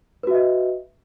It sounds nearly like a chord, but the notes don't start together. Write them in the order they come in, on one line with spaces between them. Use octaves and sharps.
B4 F#4 E5 D#5